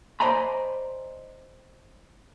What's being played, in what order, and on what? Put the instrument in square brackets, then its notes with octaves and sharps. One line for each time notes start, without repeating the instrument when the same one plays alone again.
[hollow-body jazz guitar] C5 D5 D#5 G#5 A#5 B5